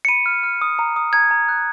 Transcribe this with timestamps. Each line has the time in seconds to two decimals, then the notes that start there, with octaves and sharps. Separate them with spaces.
0.05 C#7
0.09 B5 D#7
0.26 F6
0.43 F6
0.61 D#6
0.79 A#5
0.96 D#6
1.13 A#5 G#6
1.31 A#5
1.49 F#6